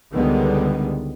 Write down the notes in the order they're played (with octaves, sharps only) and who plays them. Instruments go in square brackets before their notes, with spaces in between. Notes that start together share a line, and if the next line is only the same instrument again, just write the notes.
[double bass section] C#2 D3 D#3 G3 G#3 B3